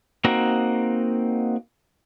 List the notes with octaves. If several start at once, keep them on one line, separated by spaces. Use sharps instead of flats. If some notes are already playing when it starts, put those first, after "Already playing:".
A#3 C4 D#4 F#4 A#5